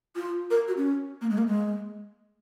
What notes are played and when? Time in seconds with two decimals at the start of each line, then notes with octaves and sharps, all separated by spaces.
0.16 F4
0.51 A#4
0.68 F#4
0.77 C#4
1.21 A#3
1.30 G#3
1.38 A#3
1.47 G#3